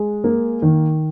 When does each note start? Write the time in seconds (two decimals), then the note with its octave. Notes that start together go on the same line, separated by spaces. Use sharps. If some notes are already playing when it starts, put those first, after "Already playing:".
Already playing: G#3
0.24 A#3
0.62 D#3